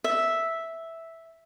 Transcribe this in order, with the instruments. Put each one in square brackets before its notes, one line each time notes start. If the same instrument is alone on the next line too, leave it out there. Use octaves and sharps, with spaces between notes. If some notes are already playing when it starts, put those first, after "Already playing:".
[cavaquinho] E5